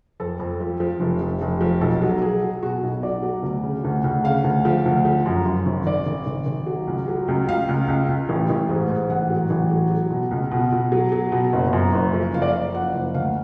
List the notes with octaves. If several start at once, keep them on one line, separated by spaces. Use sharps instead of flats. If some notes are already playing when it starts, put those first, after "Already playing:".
F2 A4
F2
F3
F3
F1
F1
F1
F3
B1 A4
F#3
F#3 G#4
F#3
B2 F#4
B1
B2 D5
F#3
D2
C#3
D2
D2
C#3 F5
D2
F3
D2
F3
F#2
F#2
G#1
G#1 D5
G#1
G#1
G#1
F#3
C#2
F#3
C#2
C#2 F5
C#2
C#2
C#2
A1
A1
G#2
G#2
A1 F#5
F#3
A1
F#3
F#3
B2
C#2
B2
B2
F#3
F#3
B2
F#1
F#2
F#1
F3
F#1 F5
D5
F5
F#1
F3 F#5
F#1
D2 F5